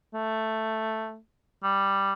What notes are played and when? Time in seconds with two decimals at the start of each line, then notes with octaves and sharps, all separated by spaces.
0.14 A3
1.63 G3